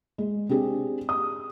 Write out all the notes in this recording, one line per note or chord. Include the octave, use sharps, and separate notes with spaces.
G#3
C4 D4 G4 G#4
D#6